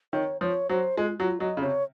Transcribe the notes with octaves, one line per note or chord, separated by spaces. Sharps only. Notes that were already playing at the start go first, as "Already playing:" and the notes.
D#3 C#5
F3 C#5
F#3 C5
G#3 F4
F#3 F#4
F4
F#3 D#5
C#3
C3 C#5